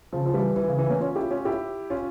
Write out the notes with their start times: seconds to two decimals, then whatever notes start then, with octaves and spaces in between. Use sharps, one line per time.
0.13 C#3 F3
0.26 F3
0.34 E3 G3
0.56 E3
0.68 C#3
0.78 E3
0.89 A#3 C#4
1.01 C#4 F4
1.16 E4 G4
1.31 C#4 F4
1.45 E4 G4
1.90 C#4 F4